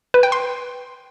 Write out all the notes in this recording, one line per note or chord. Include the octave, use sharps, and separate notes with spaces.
B4
G5
C6